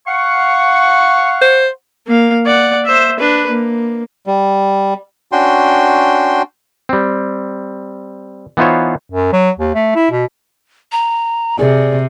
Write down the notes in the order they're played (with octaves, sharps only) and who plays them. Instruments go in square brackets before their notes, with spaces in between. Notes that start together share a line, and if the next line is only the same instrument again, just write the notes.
[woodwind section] F5 F#5 C#6
[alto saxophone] C5
[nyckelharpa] A#3 F5
D5 F#5
C5 E5
D4 B4
A#3
[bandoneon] G3
[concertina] C#4 D4 F#4 G5 C6
[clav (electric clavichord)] G3 C4
E3 B3 D#4 F4 C5 C#5
[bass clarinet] F#2
F#3
D#2
A3
E4
B2
[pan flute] A#5
[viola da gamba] C3 [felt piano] G#4 [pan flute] D5